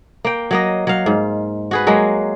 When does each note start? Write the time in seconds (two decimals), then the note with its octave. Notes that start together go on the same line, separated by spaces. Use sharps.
0.25 A#3 G5
0.51 F#3 A#3 D#5
0.87 F#3 F5
1.06 G#2
1.71 F#4 G#4 B4
1.87 F#3 G#3 A#3